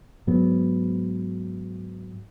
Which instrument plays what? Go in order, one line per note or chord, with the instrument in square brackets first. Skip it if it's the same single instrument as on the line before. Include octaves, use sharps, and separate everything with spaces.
[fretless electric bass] G#2 F#3 B3